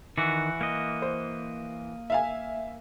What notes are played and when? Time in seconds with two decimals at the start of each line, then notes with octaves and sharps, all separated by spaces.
0.17 D#3 E3 F#4
0.61 A#3 D#5
1.02 C5
2.10 E5 F5 G#5